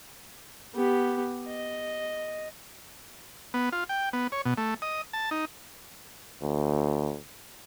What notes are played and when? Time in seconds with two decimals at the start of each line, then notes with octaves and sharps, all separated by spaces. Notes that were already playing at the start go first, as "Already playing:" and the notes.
0.75 B3 G4
1.47 D#5
3.54 B3
3.72 F4
3.89 G5
4.13 B3
4.32 C#5
4.45 B2
4.58 A3
4.82 D#5
5.13 A5
5.31 D#4
6.41 D2